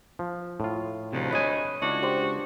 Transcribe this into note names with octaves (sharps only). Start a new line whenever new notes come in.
F3
A2 F4
D2 C3 D#3 F3
B4 C#5 D#5 G#5
C#2 D4 E4 F#4
D4 G4 C5